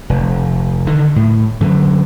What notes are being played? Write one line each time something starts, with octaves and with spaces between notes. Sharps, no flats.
F1
D3 D#3
A2
F#2 D3